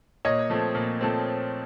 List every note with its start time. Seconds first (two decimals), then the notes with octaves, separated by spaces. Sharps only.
0.25 A#2 C#5 D#5
0.50 F3 A3 C4
0.75 A#2
1.01 F3 A3 C4